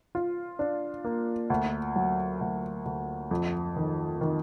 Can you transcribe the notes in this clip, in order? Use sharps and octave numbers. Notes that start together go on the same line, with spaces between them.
F4
D4
A#3
D2
F#3
D2
D2
F2
D#3
D#3